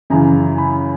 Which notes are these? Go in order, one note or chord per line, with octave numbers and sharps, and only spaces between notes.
F#2 C#3 E3 A#5
B5